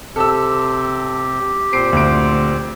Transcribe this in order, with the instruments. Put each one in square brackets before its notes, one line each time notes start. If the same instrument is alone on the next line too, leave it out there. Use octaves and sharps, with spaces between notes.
[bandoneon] C3 C4 [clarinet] G4 [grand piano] A4 E6
[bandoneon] A#2 C4 C5 [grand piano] C7 D7
[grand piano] D2 D7